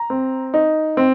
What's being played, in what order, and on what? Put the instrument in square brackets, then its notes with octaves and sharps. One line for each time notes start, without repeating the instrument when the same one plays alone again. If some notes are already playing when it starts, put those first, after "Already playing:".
Already playing: [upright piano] A#5
C4
D#4
C4